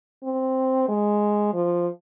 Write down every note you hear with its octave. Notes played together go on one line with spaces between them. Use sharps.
C4
G#3
F3